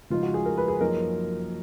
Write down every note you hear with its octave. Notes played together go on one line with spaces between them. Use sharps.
C#3 F3 G#3 D#4 F4
F#4
G#4
A#4
B4
G#4
F#2 F3 A#3 D#4 A#4